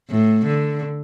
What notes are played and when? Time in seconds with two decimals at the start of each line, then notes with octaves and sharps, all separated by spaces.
0.10 A2
0.47 D3